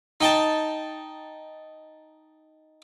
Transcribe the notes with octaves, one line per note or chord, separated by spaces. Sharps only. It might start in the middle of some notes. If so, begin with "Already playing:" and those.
D#4 G5 A5